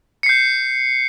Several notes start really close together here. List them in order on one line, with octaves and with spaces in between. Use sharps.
C#7 C7 G6